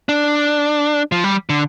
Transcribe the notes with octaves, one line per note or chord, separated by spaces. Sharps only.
D4
F3
G3
D3